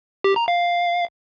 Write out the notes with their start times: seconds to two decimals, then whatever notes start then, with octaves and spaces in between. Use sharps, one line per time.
0.24 G4
0.36 A#5
0.48 F5